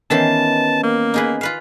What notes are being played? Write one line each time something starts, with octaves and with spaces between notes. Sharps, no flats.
D#3 E3 B3 C#4 A5 C6
A#3
D#4 G#4 B4
F4 B4 F5